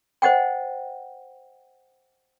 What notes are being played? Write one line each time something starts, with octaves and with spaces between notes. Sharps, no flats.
C5 D#5 F#5 G5